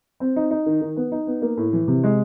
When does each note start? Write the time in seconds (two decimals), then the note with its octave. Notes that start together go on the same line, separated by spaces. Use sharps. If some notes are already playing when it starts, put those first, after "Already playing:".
0.20 C4
0.36 D#4
0.51 D#4
0.66 D#3
0.81 D#3
0.96 B3
1.12 D#4
1.27 B3
1.42 A#3
1.57 A2
1.73 E3
1.88 C3
2.04 G#3